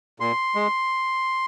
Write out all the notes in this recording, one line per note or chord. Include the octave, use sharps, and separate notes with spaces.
A#2 C6
G#3